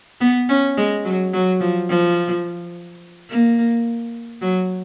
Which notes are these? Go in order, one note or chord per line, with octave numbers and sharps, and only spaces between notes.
B3
C#4
G#3
F#3
F#3
F3
F3
A#3
F#3